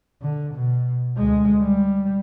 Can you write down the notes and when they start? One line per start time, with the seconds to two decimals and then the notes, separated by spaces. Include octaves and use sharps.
0.21 D3
0.55 B2
1.17 D2 G#3
1.61 G3